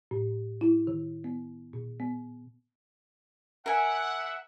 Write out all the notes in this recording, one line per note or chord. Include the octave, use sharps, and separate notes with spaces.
A2
E4
D#3
B3
A#2
B3
A#4 E5 F#5 G#5